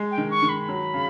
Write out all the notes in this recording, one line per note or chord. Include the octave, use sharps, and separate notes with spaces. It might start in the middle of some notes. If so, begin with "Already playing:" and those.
Already playing: G#3
G5
D#3
C#6
D#3
B5
F#3
C#3